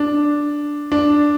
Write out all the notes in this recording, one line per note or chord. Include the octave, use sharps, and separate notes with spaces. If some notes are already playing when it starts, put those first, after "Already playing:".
Already playing: D4
D4